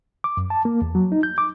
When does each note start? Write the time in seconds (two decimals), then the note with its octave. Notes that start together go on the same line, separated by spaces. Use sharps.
0.24 D6
0.37 F#2
0.50 A5
0.65 A#3
0.82 E2
0.95 F#3
1.12 D#4
1.23 G6
1.38 D6